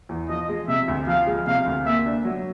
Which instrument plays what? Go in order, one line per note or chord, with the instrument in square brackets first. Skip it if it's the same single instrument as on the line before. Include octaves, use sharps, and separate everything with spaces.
[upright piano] E2
[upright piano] F3 [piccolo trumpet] D#5
[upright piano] G#3
[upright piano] C3 [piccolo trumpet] E5
[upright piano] D2
[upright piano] F3 [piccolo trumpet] F5
[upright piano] G#3
[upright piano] C3 [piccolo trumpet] F5
[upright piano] D2
[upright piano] A#3 [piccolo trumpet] E5
[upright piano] D4
F#3